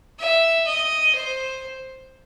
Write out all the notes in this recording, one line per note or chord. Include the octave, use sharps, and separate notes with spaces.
E5
D#5
C5